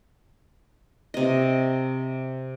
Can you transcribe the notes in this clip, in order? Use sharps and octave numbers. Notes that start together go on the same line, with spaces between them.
C3 D#5